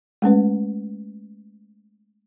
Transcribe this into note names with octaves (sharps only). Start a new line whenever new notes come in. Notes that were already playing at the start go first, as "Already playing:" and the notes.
G#3 A3 C#4 B4